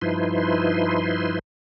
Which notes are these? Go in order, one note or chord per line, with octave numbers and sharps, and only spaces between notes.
G2 F3 D#4 E4 B4 C6